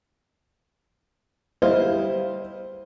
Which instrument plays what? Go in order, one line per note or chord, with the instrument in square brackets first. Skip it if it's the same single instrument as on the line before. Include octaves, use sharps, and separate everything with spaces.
[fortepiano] G3 E4 C5 D#5 F5